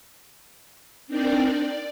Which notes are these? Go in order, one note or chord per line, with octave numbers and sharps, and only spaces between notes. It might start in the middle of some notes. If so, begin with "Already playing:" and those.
C4 D4 D#4 A#4 D5 G5
D5